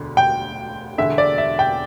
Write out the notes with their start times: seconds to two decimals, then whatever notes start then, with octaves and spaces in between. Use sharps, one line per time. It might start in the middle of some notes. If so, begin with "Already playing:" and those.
Already playing: E1 D2 D3
0.17 G5
0.98 E1 E2 D3 E5
1.18 D5
1.38 E5
1.59 G5